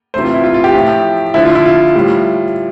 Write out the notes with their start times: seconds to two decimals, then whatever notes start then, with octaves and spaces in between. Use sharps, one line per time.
0.14 C3 E3 A3 C5
0.24 F4
0.34 E4
0.44 F4
0.54 F4
0.64 G4
0.74 A2 F3 A3
1.34 D3 F3 A3 E4
1.45 F4
1.55 E4
1.65 F4
1.95 A2 G3